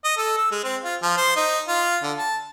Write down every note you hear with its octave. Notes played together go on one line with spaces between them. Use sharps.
D#5
A4
E6
G#3
C4
F4
F3
C5
D#4
F4
D3
A5